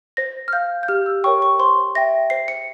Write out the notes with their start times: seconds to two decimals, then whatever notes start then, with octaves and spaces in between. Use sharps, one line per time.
0.17 C5 A#6
0.48 F6
0.53 F5 G6
0.83 G6
0.88 G4 F6
1.06 E6
1.24 A#4 C#5 G5 C#6
1.42 C#6
1.59 C5 C6
1.95 E5 G5 A#6
2.30 C5 C7
2.48 C#7